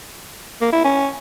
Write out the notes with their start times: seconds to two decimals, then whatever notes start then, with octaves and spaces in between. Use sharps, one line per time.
0.61 A#3
0.73 E4
0.84 C#4